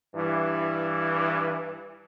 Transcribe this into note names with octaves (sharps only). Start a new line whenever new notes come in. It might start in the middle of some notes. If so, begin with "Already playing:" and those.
G2 E3